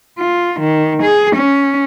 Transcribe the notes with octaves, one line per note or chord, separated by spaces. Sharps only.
F4
D#3
G#4
C#4